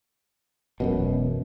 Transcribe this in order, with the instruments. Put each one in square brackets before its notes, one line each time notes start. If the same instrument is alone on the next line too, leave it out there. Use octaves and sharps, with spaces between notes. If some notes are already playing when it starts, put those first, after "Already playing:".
[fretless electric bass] E1 F#2 B2